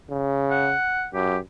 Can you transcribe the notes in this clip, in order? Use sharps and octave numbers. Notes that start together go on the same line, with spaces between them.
C#3
F#5
F#2 G4